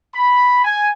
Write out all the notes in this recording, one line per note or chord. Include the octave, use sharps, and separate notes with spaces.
B5
G#5